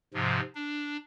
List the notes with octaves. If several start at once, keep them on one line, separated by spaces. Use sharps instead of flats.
G#2 C3 F3
D4